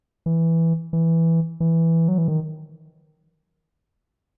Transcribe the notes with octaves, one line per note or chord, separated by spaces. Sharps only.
E3
E3
E3
F#3
E3
D#3